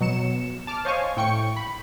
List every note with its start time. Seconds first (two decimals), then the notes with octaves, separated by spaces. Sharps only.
0.01 B2 F#3 C#7 E7
0.67 A5 D6 F6
0.85 C5 C#5 D#5 F5 G#5 C#6
1.17 A2 G5 C#6 C#7
1.56 B5